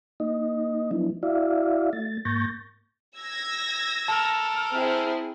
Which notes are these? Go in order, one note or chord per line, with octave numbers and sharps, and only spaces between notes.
A#3 D#4 D#5
F3 F#3 B3 D4 E4
E4 F#4 D5 E5 F5
A3 A6
G#2 A#3 C#6 G6 A6 A#6
E6 G#6 A#6
A4 A#4 A5
C4 E4 G#4